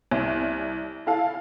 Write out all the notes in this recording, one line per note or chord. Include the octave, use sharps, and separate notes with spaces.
C2
E4 A4 F5